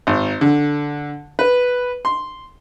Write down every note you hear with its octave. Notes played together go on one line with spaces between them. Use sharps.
G#1
D3
B4
C6